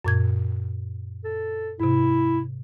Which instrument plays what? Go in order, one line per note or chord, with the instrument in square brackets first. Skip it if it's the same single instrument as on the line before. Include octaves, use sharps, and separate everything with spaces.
[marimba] F#2 A#2 G#6
[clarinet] A4
[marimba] G#2 C3 [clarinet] E4